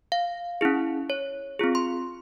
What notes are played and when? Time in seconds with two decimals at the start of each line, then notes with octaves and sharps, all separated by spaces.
0.12 F5
0.61 C#4 E4 G#4
1.10 C#5
1.59 C4 F4 G#4
1.75 C6